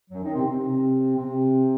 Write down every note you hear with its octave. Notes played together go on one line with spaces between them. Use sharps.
F#2 F#3
D#3 D#4
C3 C4
C3 C4
C3 C4